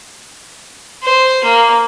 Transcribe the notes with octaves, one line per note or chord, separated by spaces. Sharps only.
C5
A#3